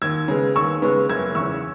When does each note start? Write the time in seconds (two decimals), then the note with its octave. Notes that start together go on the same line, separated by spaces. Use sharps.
0.02 D#2 E6 G#6
0.28 C#3 G#3 B3
0.55 D#2 C#6 E6
0.82 C#3 G#3 B3
1.09 F#1 E6 G#6
1.35 E2 C#3 C#6 E6